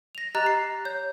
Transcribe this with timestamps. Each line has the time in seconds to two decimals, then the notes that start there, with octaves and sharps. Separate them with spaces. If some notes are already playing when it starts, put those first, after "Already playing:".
0.15 A#6 F7
0.35 G4 D#5 A#5 F#6 A6 F7
0.46 C7
0.85 C#5 G6